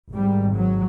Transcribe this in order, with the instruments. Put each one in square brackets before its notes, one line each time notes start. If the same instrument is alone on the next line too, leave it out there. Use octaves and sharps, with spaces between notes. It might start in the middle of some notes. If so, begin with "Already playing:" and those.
[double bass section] G#1 G#2 G3
F#3